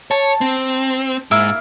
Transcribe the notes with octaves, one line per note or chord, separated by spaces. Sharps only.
C#5 A5
C4
G#2 A#3 E4 E6